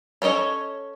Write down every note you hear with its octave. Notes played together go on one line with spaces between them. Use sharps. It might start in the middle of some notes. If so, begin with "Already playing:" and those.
C#4 A4 C#5 D#5